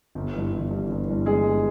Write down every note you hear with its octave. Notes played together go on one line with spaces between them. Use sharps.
G1
G2 E3
G1
G2 E3
G1
G2 E3
G1 G#3 G#4
G2 E3